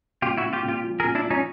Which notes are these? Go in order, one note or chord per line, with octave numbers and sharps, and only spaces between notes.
A#2 F4 G4
E4 F#4
A#2
F4 G4
A#2
F4 G4
F3
G#4 A#4
A#2
D4 E4
F3
C#4 D#4